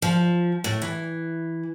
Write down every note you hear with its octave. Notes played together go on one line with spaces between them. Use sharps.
F3
A2
E3